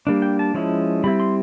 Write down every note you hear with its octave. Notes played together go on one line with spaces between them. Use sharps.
G3 A#3 D4
G5
A5
F3 G#3 C#4 E4
G3 C4 E4 B5
C6